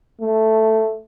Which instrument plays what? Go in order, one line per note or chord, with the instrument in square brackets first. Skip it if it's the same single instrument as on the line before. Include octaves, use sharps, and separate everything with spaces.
[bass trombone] A3